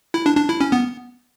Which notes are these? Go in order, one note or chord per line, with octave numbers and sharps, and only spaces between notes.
E4
D4
D4
E4
C#4
B3